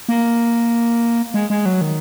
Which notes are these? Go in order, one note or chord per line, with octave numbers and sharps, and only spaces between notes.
A#3
G#3
G#3
F#3
D#3